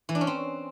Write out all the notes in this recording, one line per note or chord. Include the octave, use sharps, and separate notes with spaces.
E3
D4
C#4
C4